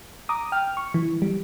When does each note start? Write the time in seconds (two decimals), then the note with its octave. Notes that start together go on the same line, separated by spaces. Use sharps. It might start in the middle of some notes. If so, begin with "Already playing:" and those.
0.29 A#5 D6 D#6
0.52 G5 F6
0.77 C#6
0.94 E3
1.22 G3